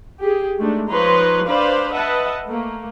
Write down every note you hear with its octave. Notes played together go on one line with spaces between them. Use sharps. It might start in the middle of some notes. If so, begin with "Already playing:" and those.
G4 G#4
G#3 A3 D4 D#4
F3 D#4 B4 C#5 A#5 C6
D4 B4 C5 D5 F5 B5
B4 D#5 E5 F#5 A5
A3 A#3